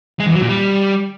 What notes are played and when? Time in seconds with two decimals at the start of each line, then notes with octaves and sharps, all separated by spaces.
0.20 G#3
0.27 E2
0.35 F#3
0.42 A#2
0.49 G3